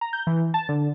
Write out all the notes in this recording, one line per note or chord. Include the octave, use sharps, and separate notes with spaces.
A#5
G6
E3
A5
D3